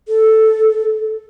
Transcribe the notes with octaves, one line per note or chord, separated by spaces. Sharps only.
A4